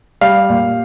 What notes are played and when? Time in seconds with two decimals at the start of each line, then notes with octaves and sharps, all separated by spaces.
0.21 G3 F5
0.50 A#2